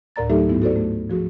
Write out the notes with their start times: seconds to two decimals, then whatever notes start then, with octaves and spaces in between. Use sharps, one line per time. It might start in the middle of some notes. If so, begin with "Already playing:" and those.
0.16 D2 A2 A#4 D5 A#5 A6
0.30 F#3 A3 D#4 G4 A4 E5
0.48 G#2 F#3 B3 E4
0.62 F#4 A4 C5 D5
0.76 A3
1.10 F3 F#4 G#4